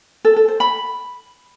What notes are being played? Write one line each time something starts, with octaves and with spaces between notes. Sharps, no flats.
A4
A4
C5
B5